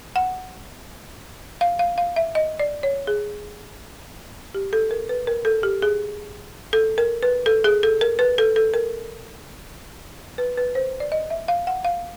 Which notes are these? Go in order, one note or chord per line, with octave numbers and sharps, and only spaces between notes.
F#5
F5
F5
F5
E5
D#5
D5
C#5
G#4
G4
A4
A#4
B4
A#4
A4
G4
G#4
A4
A#4
B4
A4
G#4
A4
A#4
B4
A4
A4
A#4
B4
B4
C5
D5
D#5
E5
F5
F#5
F5